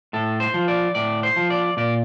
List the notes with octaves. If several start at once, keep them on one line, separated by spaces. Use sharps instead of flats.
A2 A4
C5
F3
D5
A2 D5
C5
F3
D5
A#2 D5